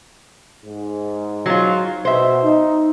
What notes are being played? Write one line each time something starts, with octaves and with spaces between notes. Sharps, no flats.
G#2
F#3 F4
B2 C5 E5
D#4